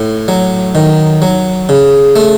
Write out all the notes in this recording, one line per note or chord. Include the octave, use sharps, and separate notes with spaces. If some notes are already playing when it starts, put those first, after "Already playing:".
Already playing: A2
F#3
D#3
F#3
C#3
A3